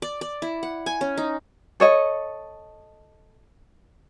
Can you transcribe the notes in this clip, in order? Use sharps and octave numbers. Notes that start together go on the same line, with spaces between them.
D5
D5
E4
F#5
G#5
C#4
D#4
A4 C#5 D#5